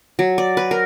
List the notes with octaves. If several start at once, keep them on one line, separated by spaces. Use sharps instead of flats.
F#3
D5
B4
A#4